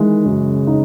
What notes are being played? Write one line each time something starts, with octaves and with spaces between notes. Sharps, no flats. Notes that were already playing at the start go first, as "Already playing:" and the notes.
Already playing: D#3 E3 G#3
F#2 C#3
D#4